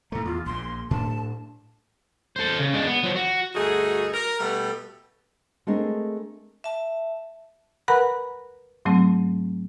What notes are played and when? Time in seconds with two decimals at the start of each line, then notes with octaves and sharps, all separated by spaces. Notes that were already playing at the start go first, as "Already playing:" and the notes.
0.12 A2 A3 A#5
0.25 E2 F4
0.46 A#1 A#2 C6
0.91 A2 D4 A5
2.36 A4 C5
2.59 C#3
2.73 G#3 D4
2.86 B3
3.03 F3 F#3
3.15 F#4
3.55 D2 G2 A3 D#4 F#4 G#4
4.14 A#4
4.40 B2 G3 A3 B3 G4
5.67 G#3 A3 C4 D4 G#4 A#4
6.64 E5 A5
7.88 A#4 B4 F#5 A#5 B5 F#6
8.85 G#2 F#3 A3 C4